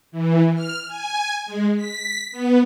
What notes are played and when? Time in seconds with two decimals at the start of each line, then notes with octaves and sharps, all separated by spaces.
0.12 E3
0.55 F6
0.88 G#5
1.46 G#3
1.76 B6
2.32 B3